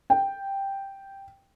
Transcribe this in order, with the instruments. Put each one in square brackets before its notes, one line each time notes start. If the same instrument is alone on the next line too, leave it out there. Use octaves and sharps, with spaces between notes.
[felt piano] G5